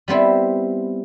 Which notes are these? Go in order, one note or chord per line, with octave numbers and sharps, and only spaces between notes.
G3 B3 C4 E4